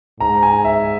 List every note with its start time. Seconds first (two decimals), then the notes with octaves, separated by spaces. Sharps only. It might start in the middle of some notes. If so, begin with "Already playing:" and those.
0.20 G#2 A#5
0.43 G#5
0.65 E5